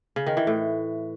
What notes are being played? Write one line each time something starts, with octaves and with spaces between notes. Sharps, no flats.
C#3
D#3
E3
A2